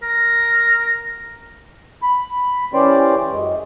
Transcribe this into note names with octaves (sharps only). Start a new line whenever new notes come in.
A#4
B5
E3 C#4 G4 C5 D5
F#2 G#3